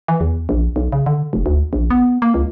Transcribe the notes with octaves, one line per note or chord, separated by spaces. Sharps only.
E3
E2
A#1
B1
C#3
D3
F1
D2
A#1
B3
A#3
C#2